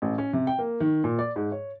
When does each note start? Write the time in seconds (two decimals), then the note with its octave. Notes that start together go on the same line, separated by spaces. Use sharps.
0.02 A1
0.18 C#4
0.33 C3
0.47 G5
0.59 A#3
0.80 D#3
1.04 A#2
1.19 D5
1.36 G#2
1.52 C#5